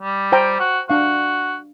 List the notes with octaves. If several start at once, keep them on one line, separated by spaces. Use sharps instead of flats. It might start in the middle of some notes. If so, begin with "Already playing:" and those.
G3
C5 G5 A#5
F#4
D4 F#4 F5